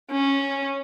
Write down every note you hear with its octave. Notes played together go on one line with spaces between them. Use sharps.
C#4